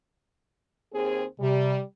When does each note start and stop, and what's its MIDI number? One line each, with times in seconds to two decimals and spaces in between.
0.92 1.23 39
0.92 1.23 60
0.92 1.23 68
1.40 1.81 48
1.40 1.80 55